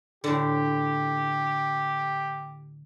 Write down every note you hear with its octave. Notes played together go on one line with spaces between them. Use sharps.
A2 D3 G4